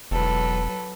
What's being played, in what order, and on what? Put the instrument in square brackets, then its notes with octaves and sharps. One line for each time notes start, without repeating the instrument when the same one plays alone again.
[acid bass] E1 [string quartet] F#3 A4 B4